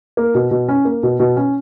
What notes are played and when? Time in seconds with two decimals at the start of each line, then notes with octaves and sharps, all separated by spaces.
0.17 A#3
0.35 B2
0.51 B2
0.68 C#4
0.85 A#3
1.03 B2
1.20 B2
1.36 C#4